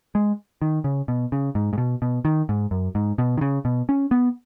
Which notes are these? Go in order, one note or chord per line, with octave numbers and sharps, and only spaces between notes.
G#3
D#3
C#3
B2
C#3
G#2
G#2
B2
B2
D#3
G#2
F#2
G#2
B2
D#3
C#3
B2
C#4
B3